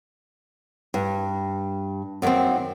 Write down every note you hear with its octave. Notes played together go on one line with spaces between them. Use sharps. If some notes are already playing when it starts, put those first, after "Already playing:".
G2
F#2 D#3 A3 A#3 C4